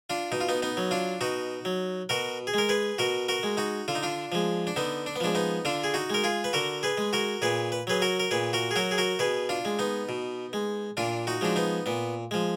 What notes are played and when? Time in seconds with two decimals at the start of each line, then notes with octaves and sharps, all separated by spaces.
0.10 D4 F4
0.32 B2 D#4
0.41 F4
0.49 B3 D#4
0.62 B3 D#4
0.77 F#3
0.91 D4 F4
1.21 B2 D#4 F#4
1.65 F#3
2.09 B2 F#4 A#4
2.47 G#4
2.54 G#3 A#4
2.69 G#4 B4
2.98 B2 F#4 A#4
3.29 F#4 A#4
3.43 G#3
3.57 D#4 F#4
3.88 D3 F4
3.95 D#4
4.03 D4 F4
4.32 F3 G#3
4.67 D4
4.76 D3 B3 D#4
5.06 D4
5.16 B3
5.20 F3 G#3 D4
5.35 B3 D#4
5.65 D3 D4 F4
5.84 G#4
5.94 D#4 F#4
6.10 G#3 A#4
6.24 F4 G#4
6.44 B4
6.53 D3 F#4 A#4
6.83 G#4 B4
6.98 G#3
7.13 F#4 A#4
7.42 A#2 G#4 B4
7.72 B4
7.87 F#3 G#4 B4
8.02 F#4 A#4
8.20 A#4
8.31 A#2 G#4 B4
8.53 F#4 A#4
8.71 G#4
8.76 F#3 F#4 A#4
8.91 G#4
8.98 F#4 A#4
9.19 B2 G#4 B4
9.49 D4 F4
9.65 G#3
9.79 B3 D#4
10.09 B2
10.53 G#3
10.97 A#2 D4 F4
11.27 D#4 F#4
11.41 F3 G#3 D4
11.56 B3 D#4
11.86 A#2 B3
12.31 F3 G#3